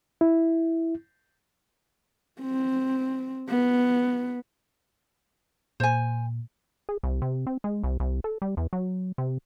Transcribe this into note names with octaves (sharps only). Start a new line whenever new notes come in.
E4
C4
B3
A#2 C5 G#5
G#4
C2
C3
C4
G#3
C2
C2
A4
G3
E2
F#3
C3